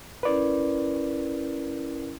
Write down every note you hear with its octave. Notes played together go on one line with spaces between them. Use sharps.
C#4 E4 A#4 B4 D5